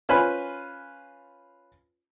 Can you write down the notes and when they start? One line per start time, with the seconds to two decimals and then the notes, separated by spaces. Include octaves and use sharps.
0.09 C#4 F4 B4 C5 G#5 B5